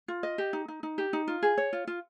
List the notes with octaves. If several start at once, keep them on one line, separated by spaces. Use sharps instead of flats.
F4
D#5
G4
D#4
D#4
D#4
G4
D#4
F4
G#4
C#5
F4
F4